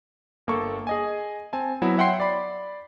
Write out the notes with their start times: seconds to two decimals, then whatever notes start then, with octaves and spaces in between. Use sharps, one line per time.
0.47 G1 A#3 A4 C#6
0.87 G#4 D#5 G#5
1.53 C4 G#5 A5
1.82 F#3 B3 E4 F#4 E5
1.97 C#5 E5 F#5 G5 C6 C7
2.20 D5 B5